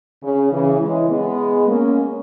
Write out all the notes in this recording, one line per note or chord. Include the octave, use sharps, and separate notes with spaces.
C#3
C#3 E3
E3 G#3
G#3 B3
A#3 C#4